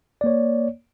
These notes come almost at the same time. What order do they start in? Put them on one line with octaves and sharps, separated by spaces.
D5 A#3 C#5